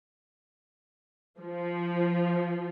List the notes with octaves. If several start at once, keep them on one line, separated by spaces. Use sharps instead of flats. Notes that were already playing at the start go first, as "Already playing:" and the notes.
F3